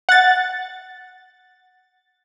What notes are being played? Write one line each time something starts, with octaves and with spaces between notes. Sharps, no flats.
F#5 A6